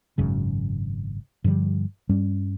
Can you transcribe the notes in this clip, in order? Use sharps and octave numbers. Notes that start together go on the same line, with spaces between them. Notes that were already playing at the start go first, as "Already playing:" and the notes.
G#1 F#2 C#3
G2 D3 F3 G3
G2 G3 C#4